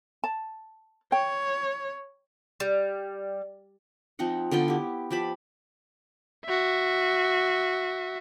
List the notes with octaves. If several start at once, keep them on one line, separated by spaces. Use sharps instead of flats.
A5
C#5 G5
G3
F3 C4 D#4 F#5
D3 B3 F4 G5
E4 G4
F3 G4 A5 B5
F#4 E5